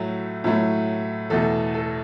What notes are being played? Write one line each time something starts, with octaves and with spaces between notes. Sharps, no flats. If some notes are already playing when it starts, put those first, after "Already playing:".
Already playing: A2 F#3 A3
A2 F#3 A3
E2 B2 A3 A4
A4